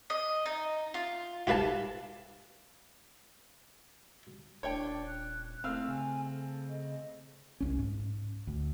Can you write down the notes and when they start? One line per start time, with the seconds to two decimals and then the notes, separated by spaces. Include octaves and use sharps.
0.10 D#5
0.46 D#4
0.94 F4
1.47 F4 G4 B4 F5 A5
4.63 D#1 D4 C#5 G5
5.06 F#6
5.64 A3 C4 F5 E6 F6
5.88 C#3 G#5
6.32 A4
6.69 D#5
7.60 C2 C#4
7.79 G#2
8.47 D2